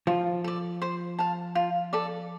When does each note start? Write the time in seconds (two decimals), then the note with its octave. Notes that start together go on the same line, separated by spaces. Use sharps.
0.07 F3 F4
0.44 A4 D5
0.82 C5
1.19 F5 A5
1.55 F4
1.93 A4 D5